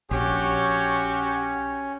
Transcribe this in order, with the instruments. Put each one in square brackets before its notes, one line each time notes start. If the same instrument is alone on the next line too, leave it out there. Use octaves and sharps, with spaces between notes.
[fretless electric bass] A#1 [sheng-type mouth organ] C#4 [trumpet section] F#4 G4 [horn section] C#5